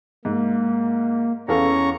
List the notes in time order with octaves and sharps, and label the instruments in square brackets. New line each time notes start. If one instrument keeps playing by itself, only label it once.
[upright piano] G#2 [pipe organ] A#3
[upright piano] E2 A4 F5 [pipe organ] C#4 A#5 C#6